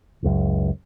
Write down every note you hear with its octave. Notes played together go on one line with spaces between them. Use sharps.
F#1 C#2 F#2